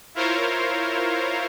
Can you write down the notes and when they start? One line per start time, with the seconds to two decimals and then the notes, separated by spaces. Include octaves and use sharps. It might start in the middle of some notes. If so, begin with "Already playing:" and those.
0.15 E4 F4 A#4 C5 C#5 F5